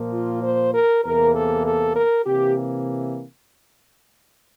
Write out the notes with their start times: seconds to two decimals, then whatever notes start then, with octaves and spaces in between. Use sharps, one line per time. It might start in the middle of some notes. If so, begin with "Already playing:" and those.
Already playing: A#2 F3 A#3
0.13 F4
0.44 C5
0.74 A#4
1.04 E2 C3 E3 A#3 A#4
1.35 A4
1.66 A4
1.96 A#4
2.26 C3 E3 A#3 G4